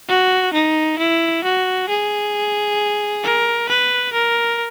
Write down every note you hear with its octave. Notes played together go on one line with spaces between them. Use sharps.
F#4
D#4
E4
F#4
G#4
A#4
B4
A#4